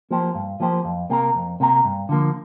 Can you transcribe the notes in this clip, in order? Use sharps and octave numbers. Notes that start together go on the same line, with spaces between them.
F3 A#3 G4 C5
G2
F3 A#3 G4 C5
F2
C3 A#3 G4 A#4
F2
C3 A#3 G4 A#4
G2
D3 F3 A#3